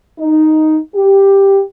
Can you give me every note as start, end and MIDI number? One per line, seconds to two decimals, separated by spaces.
0.19 0.77 63
0.94 1.61 67